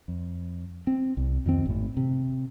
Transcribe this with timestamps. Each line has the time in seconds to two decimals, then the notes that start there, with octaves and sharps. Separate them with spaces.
0.08 F2
0.87 C4
1.17 C2
1.46 F2 D#3 C4
1.66 G#1 A2
1.97 C3